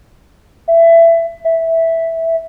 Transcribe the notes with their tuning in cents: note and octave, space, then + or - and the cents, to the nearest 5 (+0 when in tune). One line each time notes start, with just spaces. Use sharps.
E5 +20
E5 -5